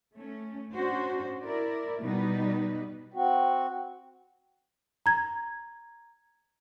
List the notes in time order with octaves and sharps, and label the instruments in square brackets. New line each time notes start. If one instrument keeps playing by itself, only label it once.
[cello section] A3 C#4
C#4 D4 F#4 C5
E4 A#4 D5
B2 G3 D#4 B4
[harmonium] C4 F#4
[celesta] A#5 G#6